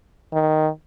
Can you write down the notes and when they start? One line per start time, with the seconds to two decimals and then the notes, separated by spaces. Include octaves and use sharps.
0.33 D#3